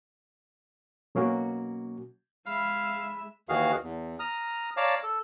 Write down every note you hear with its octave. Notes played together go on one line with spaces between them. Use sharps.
B2 F#3 A#3 C#4 F#4
G#3 E5 F5 B5
D#2 D#3 E3 F#4 G#4 F5
E2
A#5 D#6 F6
C#5 D5 F5 A5 A#5 D6
A4